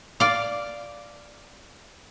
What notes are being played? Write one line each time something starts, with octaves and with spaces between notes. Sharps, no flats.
D5 F5